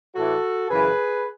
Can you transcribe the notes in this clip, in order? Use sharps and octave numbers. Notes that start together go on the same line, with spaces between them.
A2 E3 F#4 A4
F#2 C#3 E3 G#4 B4